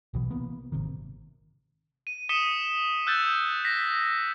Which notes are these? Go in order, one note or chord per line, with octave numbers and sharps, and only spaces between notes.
B1 B2 E3
C3 E3 A#3 B3
G#1 C3 D#3
D#7
D#6 B6 C#7 D#7 E7 G7
E6 F#6 G6 A6
A#6 B6